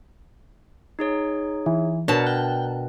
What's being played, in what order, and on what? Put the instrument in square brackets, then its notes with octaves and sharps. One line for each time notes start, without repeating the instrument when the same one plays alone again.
[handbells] D#4 G#4 C#5
[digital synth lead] E3
[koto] B2 A5 [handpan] D4 A#4 [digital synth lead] C#5
[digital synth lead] G5 [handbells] F#6